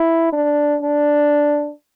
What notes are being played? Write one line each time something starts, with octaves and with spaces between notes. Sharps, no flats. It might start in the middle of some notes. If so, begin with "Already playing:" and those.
Already playing: E4
D4
D4